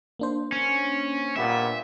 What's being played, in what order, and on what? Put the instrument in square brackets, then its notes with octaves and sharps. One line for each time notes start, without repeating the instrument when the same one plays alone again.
[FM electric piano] A#3 D4 C5
[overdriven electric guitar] C#4
[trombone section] A#2 G3 B3 [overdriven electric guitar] E5